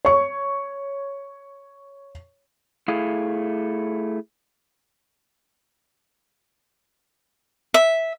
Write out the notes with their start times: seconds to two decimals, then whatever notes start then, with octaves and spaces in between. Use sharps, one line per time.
0.05 C#5 C#6
2.88 A3 E4 G#4 F5
7.74 E5